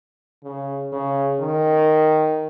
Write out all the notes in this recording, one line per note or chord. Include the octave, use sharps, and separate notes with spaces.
C#3
C#3
D#3